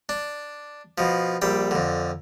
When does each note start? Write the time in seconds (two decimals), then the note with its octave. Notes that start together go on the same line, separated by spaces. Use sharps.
0.09 D4
0.98 B2 F3
1.42 A#1 G3 G5
1.71 F2 D3